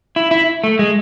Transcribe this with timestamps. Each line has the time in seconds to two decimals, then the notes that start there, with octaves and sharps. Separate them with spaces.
0.16 E4
0.31 E4
0.64 A3
0.79 G#3